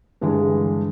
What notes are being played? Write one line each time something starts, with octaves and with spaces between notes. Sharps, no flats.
G2 D3 E3 G#3